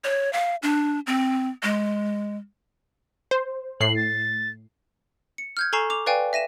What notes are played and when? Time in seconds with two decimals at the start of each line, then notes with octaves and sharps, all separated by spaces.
0.04 C#5
0.33 F5
0.63 D4
1.07 C4
1.63 G#3
3.31 C5
3.80 A2 C7 F#7
3.96 A6
5.38 C#7
5.57 F6 G6 G#6
5.73 A4 G#5 A#5 C#6 C7 E7
5.90 D6 F7
6.06 B4 D5 F5 G5 G#5
6.33 E5 A#6 D#7 E7